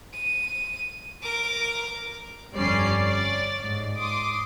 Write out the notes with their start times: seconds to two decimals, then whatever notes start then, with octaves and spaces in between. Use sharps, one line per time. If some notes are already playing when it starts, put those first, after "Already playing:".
0.13 D#7
1.23 A#4 D6
2.53 G1 F2 G3 C#4 D5 C7
3.00 C#5 D5 A6
3.64 G#2
3.95 C6 D6 D#6